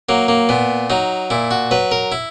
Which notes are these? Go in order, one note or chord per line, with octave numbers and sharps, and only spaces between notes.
F#3 A#3
A#3
A#2 B3
F#3 D#4
A#2 E4
F#4
F#3 B4
A#4
E4